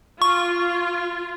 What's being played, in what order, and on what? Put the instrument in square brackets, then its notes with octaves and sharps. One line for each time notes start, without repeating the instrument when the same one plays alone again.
[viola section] F4 [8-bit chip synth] C#6